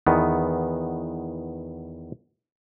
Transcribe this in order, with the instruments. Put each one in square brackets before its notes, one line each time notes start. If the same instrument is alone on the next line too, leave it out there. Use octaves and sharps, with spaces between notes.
[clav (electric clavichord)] E2 D#3 B3